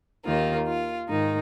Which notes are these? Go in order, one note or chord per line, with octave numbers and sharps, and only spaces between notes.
D#2 D#3 A#3 F4
F4
G#2 D#3 D#4